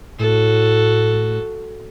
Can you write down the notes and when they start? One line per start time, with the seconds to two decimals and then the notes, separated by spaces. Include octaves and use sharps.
0.19 A2 F#4 A4